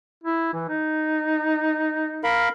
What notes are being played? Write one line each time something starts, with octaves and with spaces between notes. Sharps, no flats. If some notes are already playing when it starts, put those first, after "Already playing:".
E4
E3
D#4
A#4 F5 B5